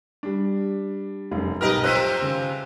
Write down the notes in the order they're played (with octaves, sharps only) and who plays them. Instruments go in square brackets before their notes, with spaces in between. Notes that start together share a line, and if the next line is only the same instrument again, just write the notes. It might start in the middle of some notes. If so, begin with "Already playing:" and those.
[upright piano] G3 D4
F1 F#2
[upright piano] B1 G4 F6 [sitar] A#4 B4 D#5
[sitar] C3 F3 C4 [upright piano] F#6 B6 D#7
[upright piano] C#3